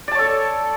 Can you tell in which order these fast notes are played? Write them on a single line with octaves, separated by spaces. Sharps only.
D5 A5 C#5 A4